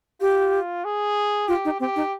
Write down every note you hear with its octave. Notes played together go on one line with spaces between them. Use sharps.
F4 G4
G#4
F4 G4
D#4
C4 G4
D#4